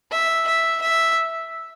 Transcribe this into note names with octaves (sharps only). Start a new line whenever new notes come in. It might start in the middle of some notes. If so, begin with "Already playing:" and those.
E5
E5
E5